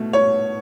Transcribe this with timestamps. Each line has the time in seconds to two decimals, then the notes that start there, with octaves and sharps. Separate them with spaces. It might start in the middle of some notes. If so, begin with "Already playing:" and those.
Already playing: B2 A3
0.13 C#5